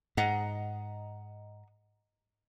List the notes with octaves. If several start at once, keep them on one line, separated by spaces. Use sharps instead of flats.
G#2 D#5 F#5 A#5